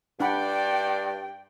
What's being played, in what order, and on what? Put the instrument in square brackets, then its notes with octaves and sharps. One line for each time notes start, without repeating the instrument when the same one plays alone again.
[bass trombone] G2 [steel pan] D4 F#5 B5 [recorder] D5 [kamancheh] G5